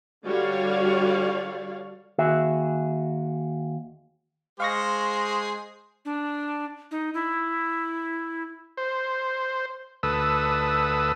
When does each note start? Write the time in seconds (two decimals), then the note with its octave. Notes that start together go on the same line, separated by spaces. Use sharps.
0.25 D3 G3 F#4 C#5 D5 F5
2.18 D#2 F#4 G#4 E5
4.60 G#3 G#4 C5 F5 C#6 A#6
6.05 D4
6.91 D#4
7.14 E4
8.77 C5
10.03 D2 A4 B4 D#6 E6